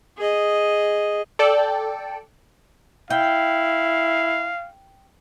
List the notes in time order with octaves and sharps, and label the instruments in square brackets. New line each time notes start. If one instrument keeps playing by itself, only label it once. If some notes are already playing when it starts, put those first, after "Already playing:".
[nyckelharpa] G#4 D#5
[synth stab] A4 D5 G5
[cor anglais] E4 [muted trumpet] F5 [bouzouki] G5